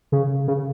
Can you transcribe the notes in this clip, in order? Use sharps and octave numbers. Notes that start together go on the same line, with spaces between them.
C#3
C#3